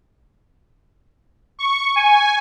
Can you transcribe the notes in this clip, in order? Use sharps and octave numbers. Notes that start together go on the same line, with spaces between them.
C#6
G#5